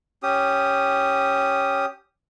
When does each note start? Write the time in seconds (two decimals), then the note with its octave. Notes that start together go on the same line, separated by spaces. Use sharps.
0.23 C#4 G4 D#6